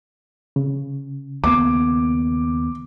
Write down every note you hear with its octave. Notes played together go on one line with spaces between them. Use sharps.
C#3
D#2 A#3 B3 D6